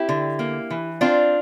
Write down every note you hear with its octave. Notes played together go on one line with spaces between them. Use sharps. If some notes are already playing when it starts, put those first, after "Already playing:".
Already playing: C4 E4 G4
D3
A#3
E3
C4 D4 F4